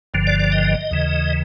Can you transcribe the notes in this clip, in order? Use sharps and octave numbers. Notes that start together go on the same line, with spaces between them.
G1 G2 D3 F3
D5
D5
D#5
D#2 C#3 E3